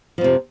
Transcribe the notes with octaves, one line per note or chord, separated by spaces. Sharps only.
F2 C3 F3